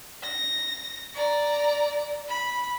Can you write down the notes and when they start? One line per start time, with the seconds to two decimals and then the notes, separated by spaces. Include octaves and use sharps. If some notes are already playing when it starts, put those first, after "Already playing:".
0.23 A#6
1.14 D5 A#5
2.28 B5